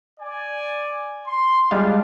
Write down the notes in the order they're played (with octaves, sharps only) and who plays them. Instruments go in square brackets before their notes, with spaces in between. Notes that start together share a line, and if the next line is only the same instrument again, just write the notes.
[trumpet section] D5 G#5
C6
[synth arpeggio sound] G3 G#3 F4 [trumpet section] D4